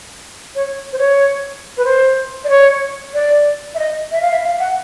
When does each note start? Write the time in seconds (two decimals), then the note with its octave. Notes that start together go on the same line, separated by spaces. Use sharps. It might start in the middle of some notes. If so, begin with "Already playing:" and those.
0.55 C#5
0.93 C5
0.98 C#5
1.77 B4
1.85 C5
2.44 D5
2.49 C#5
3.14 D5
3.75 E5
3.79 D#5
4.12 E5
4.21 F5
4.31 E5
4.44 F5
4.60 F#5